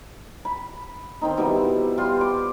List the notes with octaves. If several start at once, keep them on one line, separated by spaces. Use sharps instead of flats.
B5
D#3 C4 D#4
B2 G3 E4
G3 F4 C6
D6